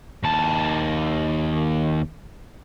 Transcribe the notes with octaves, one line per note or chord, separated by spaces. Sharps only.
D#2 A5